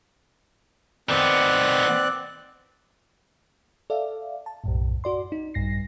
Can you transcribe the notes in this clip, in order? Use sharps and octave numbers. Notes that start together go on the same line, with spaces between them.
D#3 B3 C4 D5 F#6
A4 D5 E5 F5
A5
B1 F#2 A2
F#4 D5 C6
D#4
A#1 G2 A#6 C7